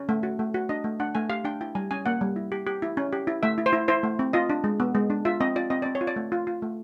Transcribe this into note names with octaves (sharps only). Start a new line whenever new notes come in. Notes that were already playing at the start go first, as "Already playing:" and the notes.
Already playing: C#4
A3
F#4
A3
F#4
D4 D#5
A3
D4 F#5
A3 G#5
G4 F5
D4 G5
E4 G5
G3 G#5
C#4 G#5
A#3 F#5
G3
E4
G4
G4
E4
C#4
G4
E4
A3 E5
E4
C5
E4
E4 C5
A3
C4
F4 D#5
D4
G#3
B3
G#3
D4
F4 E5
C4 D#5
F4 D5
C4 D#5
C4 D5
C#5
F4
D5
A3
F4
F4
A3